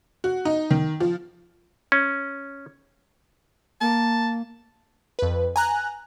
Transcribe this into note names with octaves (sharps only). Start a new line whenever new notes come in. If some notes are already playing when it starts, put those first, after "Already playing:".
F#4
D#4
D#3
F3
C#4
A#3 A5
F2 B4
G#5 A#5 F#6